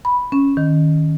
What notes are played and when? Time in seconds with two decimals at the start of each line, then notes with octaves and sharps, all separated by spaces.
0.05 B5
0.32 C#4
0.57 D#3